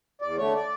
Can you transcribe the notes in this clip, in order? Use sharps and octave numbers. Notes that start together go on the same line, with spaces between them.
E2 D5
D3 A3 C#5
D5